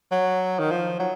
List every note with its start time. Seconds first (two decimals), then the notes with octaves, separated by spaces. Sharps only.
0.12 F#3
0.59 D#3
0.71 F3
1.00 F#3